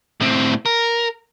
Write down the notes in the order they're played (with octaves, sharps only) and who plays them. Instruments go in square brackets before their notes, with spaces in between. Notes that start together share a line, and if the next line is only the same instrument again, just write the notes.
[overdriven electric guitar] A2 C4
A#4